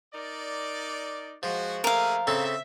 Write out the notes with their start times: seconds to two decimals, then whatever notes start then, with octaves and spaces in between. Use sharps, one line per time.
0.14 D#4 A#4 D5
1.43 F3 G#3 F#4
1.84 A3 A#3 G#4 A#4 F5
2.27 C#3 C4 A4 E5